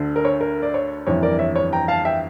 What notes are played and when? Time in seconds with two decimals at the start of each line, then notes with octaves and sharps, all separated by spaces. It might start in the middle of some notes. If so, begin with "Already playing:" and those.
Already playing: D2 D3
0.16 A#4
0.25 C#5
0.41 A#4
0.62 D5
0.74 C#5
1.07 G1 F2 E3 C#5
1.23 A#4 D5
1.39 C#5 E5
1.56 C#5
1.73 G5 A#5
1.88 F5 A5
2.05 E5 G5